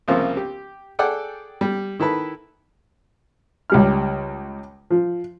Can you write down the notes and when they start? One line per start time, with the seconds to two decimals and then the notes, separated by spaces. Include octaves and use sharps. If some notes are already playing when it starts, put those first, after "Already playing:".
0.08 C2 C#3 F3 A#3
0.37 G4
0.99 G#4 A4 D5 F#5 G5
1.61 G3
1.99 D#3 E4 A4 B4
3.70 C#2 G3 F6
4.91 F3